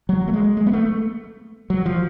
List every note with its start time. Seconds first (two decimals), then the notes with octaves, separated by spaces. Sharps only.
0.09 F#3
0.28 A3
0.34 G#3
0.57 G#3
0.67 B3
0.73 A3
1.70 F#3
1.86 F3